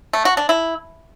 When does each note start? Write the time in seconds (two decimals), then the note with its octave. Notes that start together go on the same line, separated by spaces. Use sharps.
0.13 A3
0.25 F#4
0.37 D4
0.49 E4